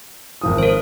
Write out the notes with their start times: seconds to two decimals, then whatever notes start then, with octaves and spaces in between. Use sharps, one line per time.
0.41 G#1 F3 D#6
0.58 A#4 C5